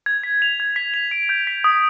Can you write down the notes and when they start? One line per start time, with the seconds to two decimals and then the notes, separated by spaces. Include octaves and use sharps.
0.06 G#6
0.24 B6
0.42 F7
0.60 G#6
0.76 B6
0.94 F7
1.11 D7
1.29 G6
1.47 B6
1.64 D#6